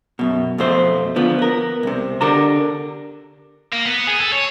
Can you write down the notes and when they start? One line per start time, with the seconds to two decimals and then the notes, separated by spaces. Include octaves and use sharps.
0.19 F#2 B2
0.58 F2 B2 A3 C5
1.16 D3 F3 B3
1.39 B3 A#4
1.83 C2 C3
2.21 D3 G4 A#4 A5 A#5
3.73 A#3
3.86 B3
4.07 G#4
4.20 A4
4.32 C#5